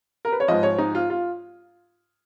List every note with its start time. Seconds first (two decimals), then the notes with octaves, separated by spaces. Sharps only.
0.25 A#4
0.33 B4
0.40 C#5
0.48 G#2 F3 D#5
0.63 C#5
0.78 D#4
0.95 F4
1.10 F4